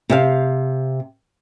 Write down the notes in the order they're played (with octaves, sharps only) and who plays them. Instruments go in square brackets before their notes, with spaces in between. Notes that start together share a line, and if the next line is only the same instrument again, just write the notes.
[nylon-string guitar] C3 G4 F5